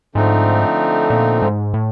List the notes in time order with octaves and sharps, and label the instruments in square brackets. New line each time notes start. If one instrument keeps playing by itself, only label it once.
[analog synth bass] G#2 [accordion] D3 F3 A3 C4 D#4
[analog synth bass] A#2
G#2
A2